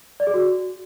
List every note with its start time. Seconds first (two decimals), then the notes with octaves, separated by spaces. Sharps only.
0.20 D5
0.27 G#4
0.34 F#4